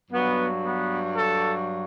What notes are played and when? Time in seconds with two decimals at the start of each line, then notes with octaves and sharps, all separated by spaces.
0.11 G2 F#3 B3
0.64 B3
1.15 A4